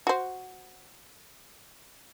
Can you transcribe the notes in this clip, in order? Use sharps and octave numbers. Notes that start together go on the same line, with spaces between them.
F#4 C5